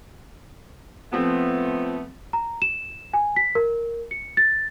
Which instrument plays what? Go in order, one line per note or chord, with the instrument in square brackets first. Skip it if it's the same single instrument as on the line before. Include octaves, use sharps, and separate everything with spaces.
[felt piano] F3 C4 [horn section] A3 B3
[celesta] A#5
E7
G#5
B6
A#4
C#7
A6